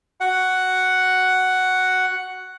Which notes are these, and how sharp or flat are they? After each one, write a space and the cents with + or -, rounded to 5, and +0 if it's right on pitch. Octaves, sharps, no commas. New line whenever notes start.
F#4 +0 F#5 +5